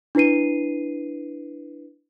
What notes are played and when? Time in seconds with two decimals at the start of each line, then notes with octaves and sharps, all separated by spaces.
0.15 D4 E4 B4 C7 D#7